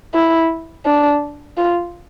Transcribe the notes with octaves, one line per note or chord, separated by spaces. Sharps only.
E4
D4
F4